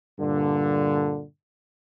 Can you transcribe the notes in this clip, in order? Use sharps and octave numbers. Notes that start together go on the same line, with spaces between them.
G2 A#2 D3